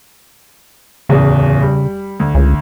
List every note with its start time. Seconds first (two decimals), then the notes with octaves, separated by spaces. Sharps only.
1.09 D1 E2 C#3
1.61 G3
2.20 D2
2.35 C#2